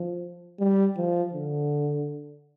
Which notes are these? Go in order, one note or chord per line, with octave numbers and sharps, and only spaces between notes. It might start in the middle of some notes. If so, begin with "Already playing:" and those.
Already playing: F3
G3
F3
D3